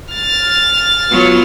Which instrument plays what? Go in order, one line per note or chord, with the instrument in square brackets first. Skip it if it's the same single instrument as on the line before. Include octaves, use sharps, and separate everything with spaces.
[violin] F6 A6
[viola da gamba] F#3 B3 F4